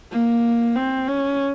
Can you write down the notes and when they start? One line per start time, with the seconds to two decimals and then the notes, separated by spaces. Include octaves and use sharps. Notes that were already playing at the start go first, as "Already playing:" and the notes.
0.12 A#3
0.76 C4
1.07 C#4